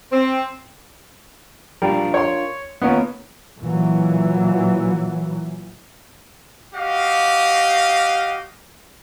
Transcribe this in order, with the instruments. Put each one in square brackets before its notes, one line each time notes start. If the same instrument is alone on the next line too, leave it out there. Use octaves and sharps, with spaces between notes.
[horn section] C4
[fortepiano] G3 [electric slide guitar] D4 F4 A#4
[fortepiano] C#5 C6
[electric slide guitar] A#3 D#4 F4 [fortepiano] B3 C#4
[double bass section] A#2 E3 F#3
[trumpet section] F#4 G4 D#5 F5